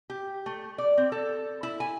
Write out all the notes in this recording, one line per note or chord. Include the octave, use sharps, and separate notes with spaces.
G4
A3
D5
C4
A4
E4
G#5